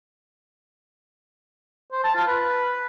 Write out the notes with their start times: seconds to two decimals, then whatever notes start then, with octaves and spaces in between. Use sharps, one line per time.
1.92 C5
2.04 A5
2.15 F4
2.27 B4